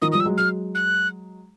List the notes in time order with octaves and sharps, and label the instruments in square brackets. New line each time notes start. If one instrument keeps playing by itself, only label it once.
[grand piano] D#3 F3 [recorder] D#6
[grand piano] F3 G3 [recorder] D#6
[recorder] E6
[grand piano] F#3 G#3
[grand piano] F#3 G#3 [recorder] F6
[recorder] F#6